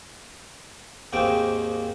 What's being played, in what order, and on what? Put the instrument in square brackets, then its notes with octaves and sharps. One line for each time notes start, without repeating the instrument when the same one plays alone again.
[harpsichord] D#2 G#2 A#3 C4 D#4 G5